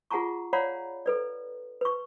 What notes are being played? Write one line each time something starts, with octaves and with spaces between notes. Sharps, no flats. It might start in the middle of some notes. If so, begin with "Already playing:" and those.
F4 G#4 F#5 A5 A#5 C#6
C#5 D5 F5 F#5 A#5 B5
A4 B4 D5
B4 C#6